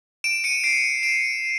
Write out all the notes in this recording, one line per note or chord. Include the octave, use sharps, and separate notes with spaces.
D7 E7
C#7 D#7
C7 D7
D7 E7